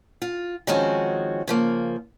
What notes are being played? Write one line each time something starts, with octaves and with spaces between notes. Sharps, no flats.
F4
D#3 F3 G#3 C4 C#4 F#4
C#3 F3 A#3